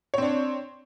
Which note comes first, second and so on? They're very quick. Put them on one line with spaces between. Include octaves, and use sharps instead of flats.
C#5 C4 D4